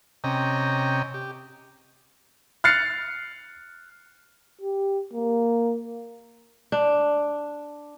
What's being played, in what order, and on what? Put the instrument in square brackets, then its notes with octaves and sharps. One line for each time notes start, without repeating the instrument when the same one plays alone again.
[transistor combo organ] C3 C#4 D#5 G5 A#5
G4
[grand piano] F6 F#6 A6 C7 C#7
[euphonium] G4
A#3
[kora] D4